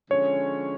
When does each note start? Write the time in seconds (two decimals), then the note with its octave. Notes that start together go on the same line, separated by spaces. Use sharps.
0.11 D3 F3 G#3 C#4 C#5